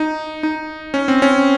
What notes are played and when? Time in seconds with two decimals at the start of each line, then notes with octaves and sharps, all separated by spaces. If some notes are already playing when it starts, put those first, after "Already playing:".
Already playing: D#4
0.43 D#4
0.94 C#4
1.08 C4
1.22 C#4